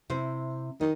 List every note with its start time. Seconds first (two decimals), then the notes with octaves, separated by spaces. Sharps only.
0.10 C3 E4 C5
0.81 D#3 D#5